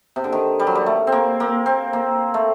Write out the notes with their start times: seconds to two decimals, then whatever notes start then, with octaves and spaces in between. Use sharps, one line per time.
0.16 C3
0.24 D3
0.32 D#3
0.59 G3
0.67 F#3
0.75 G3
0.86 A3
1.07 C4
1.12 A#3
1.40 A#3
1.66 C4
1.93 A#3
2.34 A3